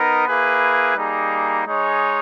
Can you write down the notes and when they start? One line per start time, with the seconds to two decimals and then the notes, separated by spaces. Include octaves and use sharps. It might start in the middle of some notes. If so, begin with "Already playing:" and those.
Already playing: B3 D#4 A#4
0.28 A#3 E4 G#4 B4
0.97 G3 A#3 D#4 G#4
1.67 G#3 D#4 G#4 C#5